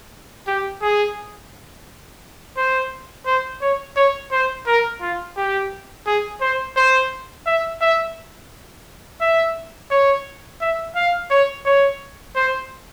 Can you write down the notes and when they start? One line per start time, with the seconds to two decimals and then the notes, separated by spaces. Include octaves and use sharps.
0.47 G4
0.82 G#4
2.57 C5
3.26 C5
3.62 C#5
3.96 C#5
4.32 C5
4.67 A#4
5.01 F4
5.37 G4
6.06 G#4
6.41 C5
6.76 C5
7.46 E5
7.81 E5
9.21 E5
9.91 C#5
10.61 E5
10.96 F5
11.30 C#5
11.66 C#5
12.35 C5